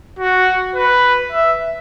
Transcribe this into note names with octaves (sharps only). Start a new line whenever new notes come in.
F#4
B4
E5